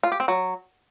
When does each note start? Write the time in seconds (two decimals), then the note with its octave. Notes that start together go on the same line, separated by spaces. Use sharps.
0.03 F4
0.12 G4
0.20 C4
0.28 F#3